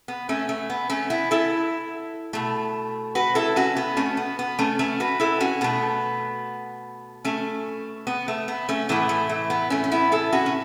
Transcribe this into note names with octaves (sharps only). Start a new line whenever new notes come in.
B3
A3 C#4
A3
B3
A3 C#4
B3 E4
E4 A4
B2 A3
F#4 B4
E4 A4
C#4 F#4
B3
A3 C#4
B3
B3
A3 C#4
A3 C#4
F#4 B4
E4 A4
C#4 F#4
B2 A3 B3
A3 C#4
B3
A3
B3
A3 C#4
A2 E3 A3 B3
A3
A3
B3
A3 C#4
C#4
B3 E4
E4 A4
C#4 F#4
C#4